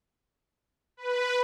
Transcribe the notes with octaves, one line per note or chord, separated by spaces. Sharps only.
B4